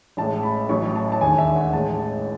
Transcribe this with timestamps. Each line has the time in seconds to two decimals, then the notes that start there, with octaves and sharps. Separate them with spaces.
0.17 A1 A2 G#3 A5
0.43 B5
0.69 A1 A2 F#3 C#6
0.96 A5
1.12 A5
1.21 E1 D#2 D#3 G#5
1.38 E5
1.56 F#5
1.73 A1 A2 G#3 A5